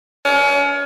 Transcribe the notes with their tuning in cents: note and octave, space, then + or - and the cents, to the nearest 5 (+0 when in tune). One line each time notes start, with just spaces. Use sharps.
C#4 +35